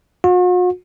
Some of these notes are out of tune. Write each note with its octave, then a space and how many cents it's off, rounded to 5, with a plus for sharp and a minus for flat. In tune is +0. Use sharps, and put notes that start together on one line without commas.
F#4 -45